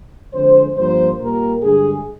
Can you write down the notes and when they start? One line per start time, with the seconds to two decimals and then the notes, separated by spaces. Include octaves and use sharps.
0.33 F2 D3 G#3 C5
0.76 G2 F3 A#3 C5
1.19 A#2 G3 A#3 A#4
1.62 G2 D3 G#3 G#4